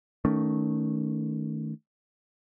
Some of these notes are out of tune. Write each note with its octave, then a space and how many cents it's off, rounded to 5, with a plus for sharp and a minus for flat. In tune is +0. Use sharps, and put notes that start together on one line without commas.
D#3 +10 A3 +0 C#4 +25